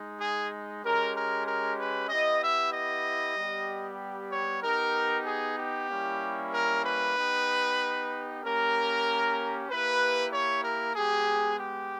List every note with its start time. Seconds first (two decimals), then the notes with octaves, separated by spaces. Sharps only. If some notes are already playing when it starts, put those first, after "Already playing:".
Already playing: G#3 D#4
0.20 G#4
0.83 G#3 C#4 G4 A#4
1.15 A#4
1.46 A#4
1.78 B4
2.09 B3 E4 G4 D#5
2.42 E5
2.73 D#5
3.36 G3 B3 G4
4.31 C#5
4.62 B3 D#4 G4 A#4
5.26 G#4
5.58 G4
5.89 G3 A#3 C#4 E4
6.52 A#4
6.85 B4
7.16 B3 D#4 G4
8.43 A#3 C#4 G4 A#4
9.69 A#3 E4 G4 B4
10.33 C#5
10.64 A#4
10.96 G#3 B3 G4 G#4
11.59 G4